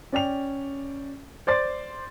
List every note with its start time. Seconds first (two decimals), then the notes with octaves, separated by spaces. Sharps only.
0.12 C#4 D5 G5 F7
1.47 C5 D5 C6 A6